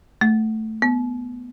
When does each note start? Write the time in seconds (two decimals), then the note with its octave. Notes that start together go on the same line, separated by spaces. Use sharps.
0.21 A3
0.82 B3